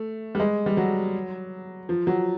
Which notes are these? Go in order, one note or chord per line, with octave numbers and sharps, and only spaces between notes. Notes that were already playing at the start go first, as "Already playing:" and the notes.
Already playing: A3
G3
G#3
G3
F#3
F3
F#3